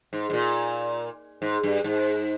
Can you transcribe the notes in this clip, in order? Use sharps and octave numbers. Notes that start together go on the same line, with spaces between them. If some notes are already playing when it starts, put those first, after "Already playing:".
G#2
G#2
A#2
G#2
G2
G#2